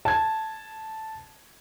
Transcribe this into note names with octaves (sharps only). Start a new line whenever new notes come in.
A5 G#6